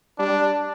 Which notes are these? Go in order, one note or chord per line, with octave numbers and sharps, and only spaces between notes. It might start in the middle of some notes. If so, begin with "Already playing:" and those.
G3 D4